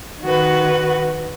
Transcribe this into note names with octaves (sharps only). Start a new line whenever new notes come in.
D#3 F#4 B4